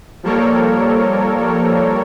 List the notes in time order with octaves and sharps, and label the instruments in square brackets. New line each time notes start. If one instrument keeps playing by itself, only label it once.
[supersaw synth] F3 G3 A#3 A4 A#4 C#5